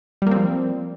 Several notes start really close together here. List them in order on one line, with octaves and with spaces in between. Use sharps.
G3 A#3 C4 F3